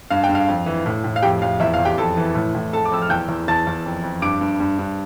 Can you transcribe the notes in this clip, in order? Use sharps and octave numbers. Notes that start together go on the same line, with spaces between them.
G2 F5
G5
G2
F5
F2
E3
A2
A2
F5
F2 G4 G5
F2 F5
E2 E5
F5
E2
G4 G5
F2 A4 A5
E3
A2
A2
F2 A4 A5
D6
F2 E6
F6
E2 G5 G6
E2
E2 A5 A6
E2
F2
F2
G2 D6 D7
G2
G2
G2